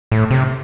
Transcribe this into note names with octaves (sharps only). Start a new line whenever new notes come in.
A2
C3